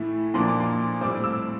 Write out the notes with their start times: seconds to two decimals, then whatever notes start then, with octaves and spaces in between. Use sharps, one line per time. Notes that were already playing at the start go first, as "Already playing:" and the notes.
Already playing: A2 E3 A3 E4
0.34 A#2 F3 A#3 D4 C6
0.48 D6
0.60 C6
1.01 A2 G3 C4 D6
1.24 E6